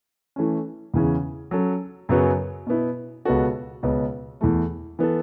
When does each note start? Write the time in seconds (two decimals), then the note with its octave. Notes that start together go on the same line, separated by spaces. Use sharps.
0.36 E3 A3 C#4
0.94 E2 C#3 E3 C#4
1.51 F#3 C#4 A4
2.09 F#2 C#3 F#3 B3 F#4
2.67 B2 B3 E4
3.25 C#2 B2 B3 F#4 A4
3.83 C#2 B2 B3
4.41 E2 E3 A3
4.99 E3 B3 A4